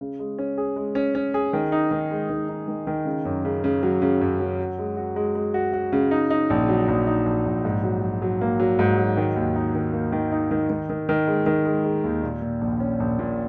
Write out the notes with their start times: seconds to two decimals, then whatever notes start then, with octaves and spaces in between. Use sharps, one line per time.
0.01 C#3
0.19 G#3
0.39 C#4
0.58 G#4
0.76 G#3
0.95 C#4
1.15 C#4
1.34 G#4
1.53 D#3
1.72 D#4
1.91 D#3
2.11 G#3
2.30 D#3
2.49 D#4
2.68 D#3
2.87 D#3
3.05 C#3
3.25 F#2
3.45 C#3
3.64 C#3
3.83 F#3
4.02 C#3
4.21 F#2
4.40 F#3
4.59 F#4
4.79 G#3
4.97 F#4
5.16 G#3
5.35 G#3
5.54 F#4
5.73 F#4
5.92 C#3
6.11 D#4
6.30 D#4
6.50 A#1
6.69 F#3
6.88 A#1
7.07 D#4
7.26 A#1
7.46 A#1
7.65 G#2
7.83 F#3
8.02 F#3
8.22 F#3
8.41 A#3
8.60 F#3
8.79 G#2
8.98 F#3
9.17 D#3
9.36 D#2
9.56 D#4
9.75 D#3
9.93 A#3
10.12 D#3
10.32 D#4
10.51 D#3
10.70 D#3
10.90 D#3
11.09 D#3
11.27 G#3
11.46 D#3
11.65 G#3
11.85 G#3
12.04 D#2
12.23 A#2
12.42 A#2
12.61 A#1
12.80 C#4
13.00 A#1
13.19 A#2